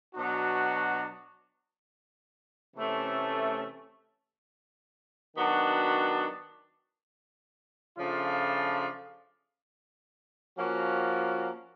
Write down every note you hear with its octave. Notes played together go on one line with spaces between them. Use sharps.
B2 F#3 B3 D4 F#4
C3 E3 A3 C#4
D#3 F#3 B3 D4 F#4
C#3 F3 A3 D4 F4
F3 A#3 C#4 F#4